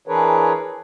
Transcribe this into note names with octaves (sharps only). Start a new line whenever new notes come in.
E3 D4 G#4 A#4 B4 C#5